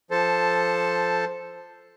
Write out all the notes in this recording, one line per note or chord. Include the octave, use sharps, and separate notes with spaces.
F3 A4 C5 A5